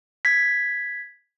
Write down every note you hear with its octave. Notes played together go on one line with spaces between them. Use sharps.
G#6 B6